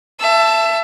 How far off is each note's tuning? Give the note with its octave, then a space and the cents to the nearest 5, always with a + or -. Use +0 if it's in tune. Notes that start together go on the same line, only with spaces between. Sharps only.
E5 +25 A5 +0